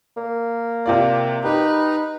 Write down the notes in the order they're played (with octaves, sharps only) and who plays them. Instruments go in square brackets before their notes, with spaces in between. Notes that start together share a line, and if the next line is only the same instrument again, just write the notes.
[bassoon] A#3
[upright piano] C3 F4 D5
[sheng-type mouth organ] D#4 B4 [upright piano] G4